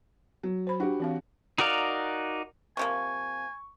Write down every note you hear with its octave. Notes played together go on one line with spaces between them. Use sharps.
F#3
C5 B5
D4 F#4 G4
E3 C4 F5
D#4 F#4 A#4 D5 F5
C3 F3 A#3 G#5 C#6